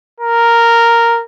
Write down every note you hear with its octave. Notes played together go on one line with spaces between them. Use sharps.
A#4